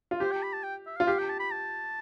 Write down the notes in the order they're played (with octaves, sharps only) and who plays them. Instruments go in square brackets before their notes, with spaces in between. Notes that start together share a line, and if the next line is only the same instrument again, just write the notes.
[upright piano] F4
[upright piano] G4 [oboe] C5
[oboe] G5
B5
A5
G5
E5
F5
[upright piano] F4
[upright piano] G4 [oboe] F5
[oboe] G5
A5
B5
A5